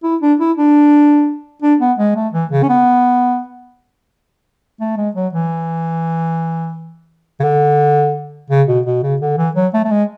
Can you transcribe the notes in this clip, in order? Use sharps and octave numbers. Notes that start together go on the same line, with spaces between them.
E4
D4
E4
D4
D4
B3
G#3
A3
E3
C#3
C#4
B3
A3
G#3
F#3
E3
C#3
D3
C#3
B2
B2
C#3
D3
E3
F#3
A3
A3
G#3